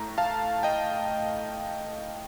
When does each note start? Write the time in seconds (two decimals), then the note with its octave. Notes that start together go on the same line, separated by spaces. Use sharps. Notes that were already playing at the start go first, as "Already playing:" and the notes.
Already playing: A2 A3 A#5
0.18 F5 A5
0.63 D#5 G5